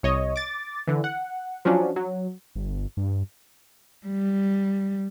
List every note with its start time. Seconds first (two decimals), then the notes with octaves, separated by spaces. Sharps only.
0.03 C2 C#5 D#5
0.36 D6 A6
0.87 D3 E3
1.04 F#5
1.65 F3 F#3 C#4 D4
1.96 F#3
2.55 G1
2.97 G2
4.07 G3